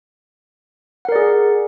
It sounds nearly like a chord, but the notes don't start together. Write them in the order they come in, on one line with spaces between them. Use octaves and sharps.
F#5 A#4 D5 G#4